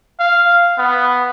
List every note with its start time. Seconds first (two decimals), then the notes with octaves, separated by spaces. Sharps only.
0.19 F5
0.78 B3